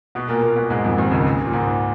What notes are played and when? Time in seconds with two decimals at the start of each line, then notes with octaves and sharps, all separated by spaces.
0.15 B2 B3
0.29 A#2 A#3
0.42 A#2 A#3
0.56 B2 B3
0.70 G#2 G#3
0.84 F2 F3
0.98 D#2 D#3
1.11 C#2 C#3
1.25 A#2
1.47 A#2
1.53 G#2